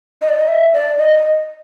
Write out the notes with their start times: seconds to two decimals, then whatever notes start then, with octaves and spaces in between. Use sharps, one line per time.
0.22 D#5
0.29 D5
0.37 D#5
0.48 E5
0.74 D5
0.98 D#5